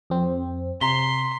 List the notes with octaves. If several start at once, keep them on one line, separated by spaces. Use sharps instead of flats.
F2 C4
C3 A#5 C6 B6 G7